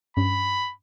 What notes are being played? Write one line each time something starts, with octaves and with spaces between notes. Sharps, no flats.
G2 C#4 B5